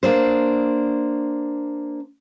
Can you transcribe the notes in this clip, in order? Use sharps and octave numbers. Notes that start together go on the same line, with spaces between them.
A#3 D4 C5